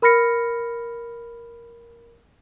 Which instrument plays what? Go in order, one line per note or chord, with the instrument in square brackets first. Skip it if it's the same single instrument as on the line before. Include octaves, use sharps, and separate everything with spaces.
[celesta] A#4 B5 F6 A#6 C#7